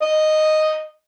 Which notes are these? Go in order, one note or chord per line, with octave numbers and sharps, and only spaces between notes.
D#5